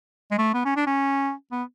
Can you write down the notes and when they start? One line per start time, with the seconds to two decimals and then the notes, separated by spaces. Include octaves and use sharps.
0.31 G#3
0.38 A3
0.53 B3
0.65 C#4
0.76 D4
0.86 C#4
1.52 B3